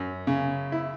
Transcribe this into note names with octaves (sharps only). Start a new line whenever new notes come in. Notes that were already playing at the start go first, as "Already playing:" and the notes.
Already playing: F#2
C#3
E4